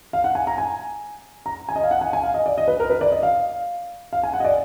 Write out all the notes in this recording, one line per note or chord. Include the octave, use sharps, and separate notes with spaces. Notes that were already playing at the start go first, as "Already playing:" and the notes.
F5
F#5
G#5
A#5
G#5
A#5
G#5
D#5
F5
F#5
G#5
G#5
F5
D#5
D5
D#5
B4
A#4
B4
D5
D#5
F5
F5
G#5
F#5
D#5
D5